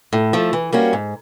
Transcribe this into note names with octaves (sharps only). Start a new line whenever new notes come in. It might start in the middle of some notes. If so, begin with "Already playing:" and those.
A2
F3 A3
E3
G3 A#3 C#4 F#4
G#2